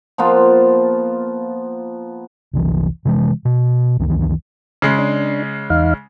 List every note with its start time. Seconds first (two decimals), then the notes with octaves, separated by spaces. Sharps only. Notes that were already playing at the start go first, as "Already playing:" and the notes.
0.18 F3 A#3 B3 F4
2.53 F1 C2 E3
3.05 C3 E3 F3 G#3
3.45 B2
3.99 C#2 F#2 D#3 E3
4.82 C#3 G#3
4.98 D4
5.70 E2 D#4 F5